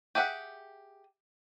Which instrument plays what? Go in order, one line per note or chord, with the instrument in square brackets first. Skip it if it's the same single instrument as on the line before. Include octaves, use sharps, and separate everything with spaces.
[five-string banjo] G4 G#4 E5 F#5